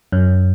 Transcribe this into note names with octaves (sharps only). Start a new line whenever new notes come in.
F#2